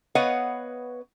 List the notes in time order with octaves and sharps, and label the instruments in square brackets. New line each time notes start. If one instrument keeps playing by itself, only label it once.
[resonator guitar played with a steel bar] B3 B4 C#5 D#5 F5 F#5